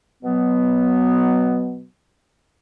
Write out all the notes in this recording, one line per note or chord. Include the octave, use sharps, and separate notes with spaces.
B2 F#3 B3